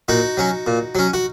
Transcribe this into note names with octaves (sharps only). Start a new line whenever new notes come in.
A#2 D#4 F#4
F#3 C#4
A#2
F#3 C#4
F#4